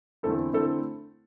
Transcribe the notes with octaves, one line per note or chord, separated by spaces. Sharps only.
E2 D3 A3 C4 E4 A4
D3 A3 C4 E4 A4